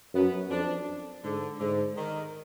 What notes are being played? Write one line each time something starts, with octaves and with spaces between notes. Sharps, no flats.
F#2 B3
F2 D4
G#2 D3
G#2 D3
D#3